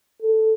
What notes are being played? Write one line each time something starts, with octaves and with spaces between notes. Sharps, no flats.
A4